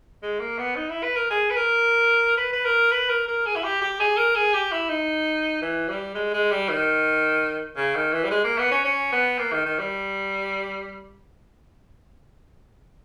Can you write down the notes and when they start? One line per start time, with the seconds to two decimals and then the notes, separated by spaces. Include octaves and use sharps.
0.23 G#3
0.40 A#3
0.58 B3
0.76 D#4
0.90 E4
1.03 B4
1.16 A#4
1.30 G#4
1.50 B4
1.56 A#4
2.38 B4
2.53 B4
2.65 A#4
2.92 B4
3.09 A#4
3.28 A#4
3.46 G#4
3.55 E4
3.64 G4
3.82 G4
4.00 G#4
4.17 A#4
4.35 G#4
4.54 G4
4.72 E4
4.89 D#4
5.62 E3
5.88 G3
6.15 G#3
6.34 G#3
6.51 G3
6.69 D#3
7.77 C#3
7.95 D#3
8.13 E3
8.24 G3
8.31 G#3
8.44 A#3
8.58 B3
8.71 C#4
8.85 C#4
9.12 B3
9.39 A#3
9.52 D#3
9.66 D#3
9.79 G3